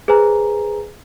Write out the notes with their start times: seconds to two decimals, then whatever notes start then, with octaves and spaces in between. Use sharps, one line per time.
0.08 G#4 B4 C5 G#5 A#5